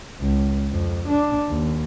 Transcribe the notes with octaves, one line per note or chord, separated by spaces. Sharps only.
C#2
F2
D4
D#2